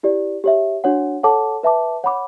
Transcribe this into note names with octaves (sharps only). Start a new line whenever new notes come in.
E4 G4 D5
G4 C#5 E5
D4 F#4 C#5 F#5
A4 C#5 F#5 A5 D6
B4 E5 A5 D6
C#5 F#5 B5 D6